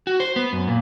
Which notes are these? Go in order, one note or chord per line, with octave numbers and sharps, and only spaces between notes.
F#4
C5
B3
F#2
A#2